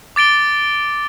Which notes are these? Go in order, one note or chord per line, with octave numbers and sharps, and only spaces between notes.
D6 A6 D7 G7